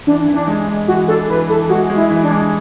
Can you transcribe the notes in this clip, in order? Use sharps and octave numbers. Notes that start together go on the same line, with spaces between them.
E3 D4
E3
D4
G#3
G#3
E3 F#4
D4 A4
E3 B4
E3 A4
G#3 F#4
G#3
E4
E3
D4
G#3